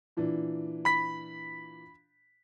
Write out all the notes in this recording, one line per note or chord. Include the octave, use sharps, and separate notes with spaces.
A#2 E3 D4
B5 B6